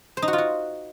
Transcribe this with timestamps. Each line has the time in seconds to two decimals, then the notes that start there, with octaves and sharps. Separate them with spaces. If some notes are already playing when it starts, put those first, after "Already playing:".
0.17 C5
0.22 D#4
0.28 F#4
0.33 F4
0.38 F#4